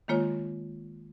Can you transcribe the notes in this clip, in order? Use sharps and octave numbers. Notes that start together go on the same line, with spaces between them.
D#3 G#3 A#3 F4 C#5